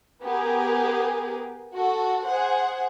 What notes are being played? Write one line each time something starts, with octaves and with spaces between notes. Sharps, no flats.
B3 G4 G#4 A#4
F#4 A4
G#4 C5 F#5